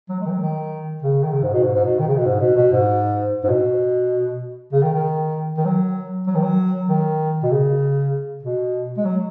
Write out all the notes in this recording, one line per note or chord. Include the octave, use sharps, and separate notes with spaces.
F#3
G#3
D#3
F#3
D#3
C#3
D#3
C#3
G#2
B2
G#2
G#2
B2
D#3
C#3
B2
G#2
B2
B2
G#2
G#2
B2
C#3
D#3
D#3
D#3
F#3
F#3
D#3
F#3
D#3
B2
C#3
B2
G#3
F#3